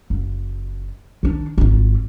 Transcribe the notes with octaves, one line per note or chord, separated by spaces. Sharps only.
F#1
D#3 D4
G#1 F4